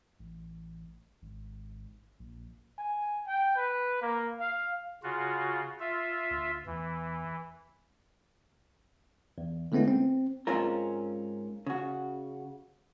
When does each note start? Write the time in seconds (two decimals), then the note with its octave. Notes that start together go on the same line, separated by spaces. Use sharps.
0.19 A1
1.22 G#1
2.19 A#1
2.79 G#5
3.27 G5
3.56 B4
4.02 A#3
4.40 F5
5.03 C#3 F4 F#4
5.80 F4 E5
6.31 D2
6.66 E2 E3
9.38 E2
9.72 D3 G#3 A3 B3 C#4 E4
9.88 C4
10.47 G#2 C4 C#4 F4 A#4
11.66 C#3 F#4